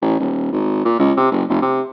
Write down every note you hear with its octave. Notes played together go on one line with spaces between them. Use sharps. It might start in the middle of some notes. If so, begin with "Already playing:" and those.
A1
D#1
G#1
A#2
C#2
C3
F#1
F1
C3